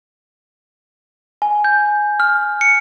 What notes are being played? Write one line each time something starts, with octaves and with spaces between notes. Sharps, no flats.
G#5
G6
F6
C#7